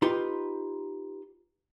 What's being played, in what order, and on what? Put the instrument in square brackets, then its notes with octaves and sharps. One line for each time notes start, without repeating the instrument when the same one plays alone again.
[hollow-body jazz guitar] D#4 F4 G4 B4 C6